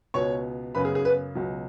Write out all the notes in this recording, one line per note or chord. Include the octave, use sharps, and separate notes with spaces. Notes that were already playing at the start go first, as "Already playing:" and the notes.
C#2 B2 B3 C#5 C#6
F#2 C#3 B3 B4 B5
G#4
G#4
B3 B4
C#2 B2 F#3